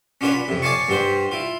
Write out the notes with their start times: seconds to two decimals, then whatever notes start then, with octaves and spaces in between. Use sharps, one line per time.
0.21 C#4 D4 F4 F#4 B4 C#5
0.34 B5
0.48 F2 C3
0.62 C#5 D5 F5 G#5 A5 C#6
0.89 G2 G3 F#4 C5
1.31 E4 F4